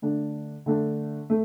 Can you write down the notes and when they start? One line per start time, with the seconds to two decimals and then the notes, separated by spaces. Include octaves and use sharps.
0.02 D3 A3 D4
0.66 D3 A3 D4
1.30 A3